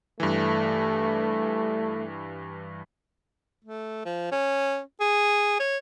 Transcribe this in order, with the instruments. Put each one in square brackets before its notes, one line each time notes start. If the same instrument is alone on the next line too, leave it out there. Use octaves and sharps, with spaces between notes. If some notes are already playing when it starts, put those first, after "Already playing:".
[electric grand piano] G2 E3 [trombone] A3
[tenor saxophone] A3
F3
C#4
G#4
C#5